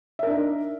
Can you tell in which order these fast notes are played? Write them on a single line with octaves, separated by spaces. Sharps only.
E5 A#4 D4 D#4